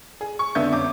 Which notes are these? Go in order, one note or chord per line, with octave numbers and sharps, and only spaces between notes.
G#4
C#6
F2 D3 B3 E5 G6
F#2 D6